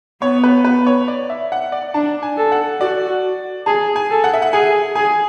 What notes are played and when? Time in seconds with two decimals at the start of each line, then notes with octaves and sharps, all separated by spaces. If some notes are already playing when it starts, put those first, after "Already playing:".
0.22 B3 C#5
0.44 B4
0.65 B4
0.87 C#5
1.08 D5
1.30 E5
1.52 F#5
1.72 D5
1.94 D4 A5
2.23 G#5
2.37 A4
2.52 F#5
2.81 F#4 D5
3.66 G#4 A5
3.96 G#5
4.10 A4
4.24 F#5
4.34 E5
4.42 F#5
4.53 G#4 G#5
4.95 G#4 G#5